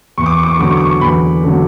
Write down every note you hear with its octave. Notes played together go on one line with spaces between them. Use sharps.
E2 C#6
D6
C#6
D6
C#6
D3 F#3 D6
C#6
D6
C#6
E2 B5
D3 F#3